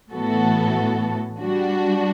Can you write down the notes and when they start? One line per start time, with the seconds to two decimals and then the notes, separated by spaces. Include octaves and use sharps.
0.12 A2 E3 B3 F#4 A4
1.41 G3 D4 F#4